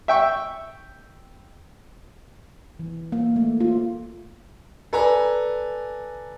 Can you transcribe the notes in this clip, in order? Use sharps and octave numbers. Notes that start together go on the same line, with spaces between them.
E5 G5 C#6
E3
A#3
A3
F4
A4 B4 D5 G#5 A#5